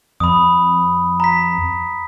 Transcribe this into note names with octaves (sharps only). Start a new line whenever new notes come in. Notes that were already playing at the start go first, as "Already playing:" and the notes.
F2 B5 D#6
A#5 B6